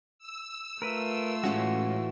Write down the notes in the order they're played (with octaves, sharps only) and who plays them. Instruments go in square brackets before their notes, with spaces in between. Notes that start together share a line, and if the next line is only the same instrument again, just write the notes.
[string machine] E6
[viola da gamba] A3 F4 [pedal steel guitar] A#4 B4
[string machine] A2 [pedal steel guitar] E3 F#4 [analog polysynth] G#3 C#4